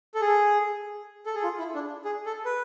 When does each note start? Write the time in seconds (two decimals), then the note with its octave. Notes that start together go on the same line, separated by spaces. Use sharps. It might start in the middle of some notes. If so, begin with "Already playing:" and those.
0.15 A4
0.21 G#4
1.26 A4
1.35 G#4
1.44 F4
1.59 E4
1.74 D4
2.05 G#4
2.26 A4
2.45 B4